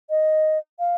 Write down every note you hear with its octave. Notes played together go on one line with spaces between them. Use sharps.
D#5
F5